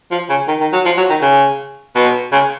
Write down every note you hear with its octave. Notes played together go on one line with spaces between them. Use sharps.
F3
C#3
D#3
D#3
F#3
F3
F#3
D#3
C#3
B2
C#3